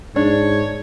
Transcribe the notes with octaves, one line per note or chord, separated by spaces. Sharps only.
G#2 D4 C#5